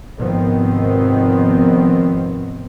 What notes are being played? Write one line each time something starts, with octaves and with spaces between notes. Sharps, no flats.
G#1 C3 D#3 F3 B3 C4